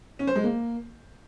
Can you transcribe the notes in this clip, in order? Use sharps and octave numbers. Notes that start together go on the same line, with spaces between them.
C#4
C5
G#3
A#3